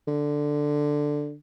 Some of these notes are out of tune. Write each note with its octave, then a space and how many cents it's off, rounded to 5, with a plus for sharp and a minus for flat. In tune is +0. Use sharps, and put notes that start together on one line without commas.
D3 +5